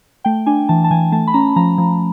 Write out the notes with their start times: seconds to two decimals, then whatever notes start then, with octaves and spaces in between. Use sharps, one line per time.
0.25 A3 G5
0.46 D4 G#5
0.69 E3 A5
0.84 A5
0.91 E3 G#5
1.12 A3 A5
1.27 B5
1.34 C#4 A#5
1.56 F3 A#5
1.78 F3